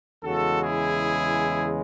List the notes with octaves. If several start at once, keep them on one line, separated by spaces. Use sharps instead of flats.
E2 C#3 G#3 F#4 A4
E4 G#4